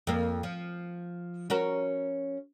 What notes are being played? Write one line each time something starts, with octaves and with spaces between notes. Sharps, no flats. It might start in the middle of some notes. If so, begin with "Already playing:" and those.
F2 A#3
F3
C#4 F#4 A#4